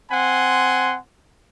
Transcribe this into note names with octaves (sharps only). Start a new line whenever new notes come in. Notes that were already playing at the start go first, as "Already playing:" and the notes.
C4 F#5 G#5 C6